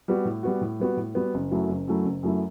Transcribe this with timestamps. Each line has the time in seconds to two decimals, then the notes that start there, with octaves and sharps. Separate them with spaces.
0.08 G3 B3 F#4
0.25 A2
0.43 G3 B3 F#4
0.61 A2
0.80 G3 B3 F#4
0.97 A2
1.15 G3 B3 F#4
1.34 F#1
1.51 F#2 F#3 A3 E4
1.69 F#1
1.88 F#2 F#3 A3 E4
2.05 F#1
2.23 F#2 F#3 A3 E4